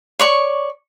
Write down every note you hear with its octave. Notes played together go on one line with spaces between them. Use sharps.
C#5 D5 C#6